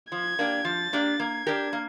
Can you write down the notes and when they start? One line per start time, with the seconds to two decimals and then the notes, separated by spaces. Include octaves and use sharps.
0.11 F3 G#6
0.39 A#3 D4 G4
0.65 F3 A6
0.93 A#3 D4 G4
1.19 A#3 G#6
1.47 D4 G4 A#4
1.73 A#3